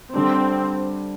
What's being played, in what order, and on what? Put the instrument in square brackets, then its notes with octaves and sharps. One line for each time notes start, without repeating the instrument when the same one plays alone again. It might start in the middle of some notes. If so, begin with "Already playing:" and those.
[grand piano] D3 G3 D4 [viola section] C4